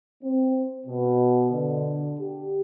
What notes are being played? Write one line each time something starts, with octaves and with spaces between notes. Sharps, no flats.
C4
B2
D3
G4